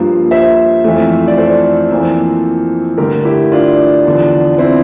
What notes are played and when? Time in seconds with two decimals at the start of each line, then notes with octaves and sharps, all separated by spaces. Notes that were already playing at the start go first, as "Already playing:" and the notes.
Already playing: G2 F3 A#3
0.31 C5 E5
0.84 F2 E3 A3
1.28 D5
1.37 A4 C5
1.92 F2 E3 A#3
2.98 G2 D3 A3 G4 A#4
3.25 E4 G4
3.52 D4 F4
4.05 E2 D3 F3
4.58 C4 E4